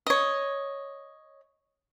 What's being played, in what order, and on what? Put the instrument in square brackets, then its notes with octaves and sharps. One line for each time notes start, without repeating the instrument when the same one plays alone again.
[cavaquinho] C#5 D#5